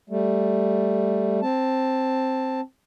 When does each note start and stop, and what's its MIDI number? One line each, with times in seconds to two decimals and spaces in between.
0.10 1.40 55
0.10 1.40 57
1.42 2.61 60
1.42 2.61 81